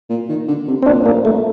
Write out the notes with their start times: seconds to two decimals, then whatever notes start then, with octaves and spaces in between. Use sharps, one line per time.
0.10 A#2
0.29 D#3
0.48 D3
0.67 C3
0.83 C4
0.86 A#2 D4
1.06 A#3
1.25 A3